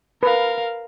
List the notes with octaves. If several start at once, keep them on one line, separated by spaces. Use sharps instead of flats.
A#4 B4 F5